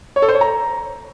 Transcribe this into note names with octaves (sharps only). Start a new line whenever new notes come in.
C#5
A4
C5
C#5
A#5